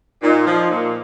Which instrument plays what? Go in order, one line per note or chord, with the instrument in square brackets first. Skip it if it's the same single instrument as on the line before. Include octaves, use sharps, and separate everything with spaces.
[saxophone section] A#2 [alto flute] D#4
[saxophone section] F3
A#2